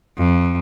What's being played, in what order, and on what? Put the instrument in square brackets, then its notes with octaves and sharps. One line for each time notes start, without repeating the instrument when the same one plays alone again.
[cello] F2